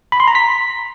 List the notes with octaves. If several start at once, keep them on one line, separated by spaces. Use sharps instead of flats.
B5
C6
A#5
B6